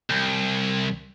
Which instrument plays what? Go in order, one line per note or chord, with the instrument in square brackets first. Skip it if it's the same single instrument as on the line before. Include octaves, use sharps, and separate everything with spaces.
[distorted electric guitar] C2